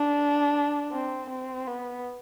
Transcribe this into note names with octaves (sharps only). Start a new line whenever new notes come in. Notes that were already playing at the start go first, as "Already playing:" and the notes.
Already playing: D4
C4
C4
B3